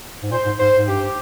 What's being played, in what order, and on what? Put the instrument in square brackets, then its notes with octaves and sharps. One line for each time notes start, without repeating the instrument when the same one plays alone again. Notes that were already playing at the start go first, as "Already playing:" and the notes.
[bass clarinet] G#2
[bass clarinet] A#2 [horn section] C5
[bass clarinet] G#2
[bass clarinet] G#2 [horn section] C5
[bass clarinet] G#2
[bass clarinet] G2 [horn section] G4